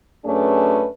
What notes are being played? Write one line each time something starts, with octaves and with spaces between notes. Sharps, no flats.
F#2 A3 C#4 D4 G#4 B4